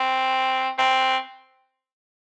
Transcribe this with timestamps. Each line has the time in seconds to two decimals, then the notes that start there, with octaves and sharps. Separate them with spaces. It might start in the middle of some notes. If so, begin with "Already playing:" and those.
Already playing: C4
0.79 C4